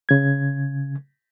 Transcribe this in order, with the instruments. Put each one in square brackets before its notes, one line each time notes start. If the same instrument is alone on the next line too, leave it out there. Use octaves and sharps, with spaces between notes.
[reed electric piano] C#3 G#6